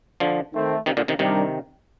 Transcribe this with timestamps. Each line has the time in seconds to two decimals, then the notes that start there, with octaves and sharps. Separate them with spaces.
0.20 D3 F3
0.53 D#3 A3 C4
0.86 C3 D#3
0.97 A#2 D3
1.08 C3 D#3
1.19 C3 D#3 G3 D4 G4 A#4